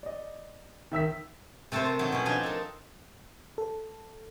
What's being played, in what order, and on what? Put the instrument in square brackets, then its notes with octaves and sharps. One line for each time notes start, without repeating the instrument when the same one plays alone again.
[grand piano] D5 D#5
D#3 E5 E6 B6
[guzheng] C3 A3 A4 A#4 C5
A4 C5
F#3 D#4
B2 C#4
F3 D4 D#4 G5 G#5
A4 A#4
[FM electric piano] A4